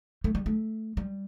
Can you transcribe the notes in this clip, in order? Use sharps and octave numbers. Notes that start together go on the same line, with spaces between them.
A3
G3
A3
G3